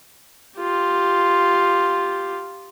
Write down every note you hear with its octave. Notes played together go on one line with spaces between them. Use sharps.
F4 G4